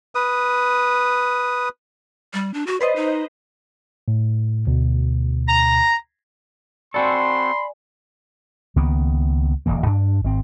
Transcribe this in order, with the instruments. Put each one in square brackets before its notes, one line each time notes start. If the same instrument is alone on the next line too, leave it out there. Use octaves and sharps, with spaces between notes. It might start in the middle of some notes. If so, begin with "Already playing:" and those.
[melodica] B4 D#6
[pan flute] G3
D4
F#4
[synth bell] B4 C5 D#5 [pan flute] D5
[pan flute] D#4
[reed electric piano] A2
D2 B2
[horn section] A#5
[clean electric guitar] C4 F#4 A4 [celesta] D5 G#5 [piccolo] B5 [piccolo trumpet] C6
[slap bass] C#2 D#3 A#3 B3
D1 G#1 E3 A#3
G2 D4
G#1 C4